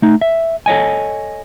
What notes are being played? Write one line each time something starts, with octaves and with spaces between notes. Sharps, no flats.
A3 D#4
E5
A4 C#5 D#5 G#5